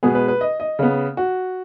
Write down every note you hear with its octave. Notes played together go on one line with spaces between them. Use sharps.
B2 G#3 B3 G#4
B4
B4
D#5
D#5
C#3 B3
F#4